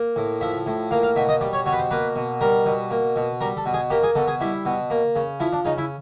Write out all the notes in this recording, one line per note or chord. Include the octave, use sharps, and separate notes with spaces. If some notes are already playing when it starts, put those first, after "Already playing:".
Already playing: A#3
A2
F3 E5
A2
A#3 F5
F5
B2 E5
D#5
G3 D5
C#5
B2 C#5
B4
C5
A#3 B4
B2
G3 A#4
B2
A#3
B2
G3 A#4
A4
B2
G#4
A#3 G4
G#4
B2 A4
G#4
G3 E4
B2
A#3
C#3
F3 E4
D4
C#3 D#4
E4